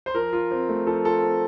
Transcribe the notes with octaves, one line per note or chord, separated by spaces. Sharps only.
C5
F3 A#4
F4
C4
A3
F3 A4
F4 A4
C4